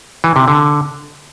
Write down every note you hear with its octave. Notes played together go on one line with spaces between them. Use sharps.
E3
C3
D3